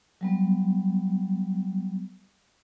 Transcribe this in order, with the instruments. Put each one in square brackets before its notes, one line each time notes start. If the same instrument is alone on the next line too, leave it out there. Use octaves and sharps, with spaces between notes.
[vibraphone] F#3 G3 B3